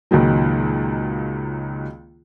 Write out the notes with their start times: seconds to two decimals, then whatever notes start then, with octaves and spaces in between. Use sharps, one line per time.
0.11 C#2 A#2 D#3 F#3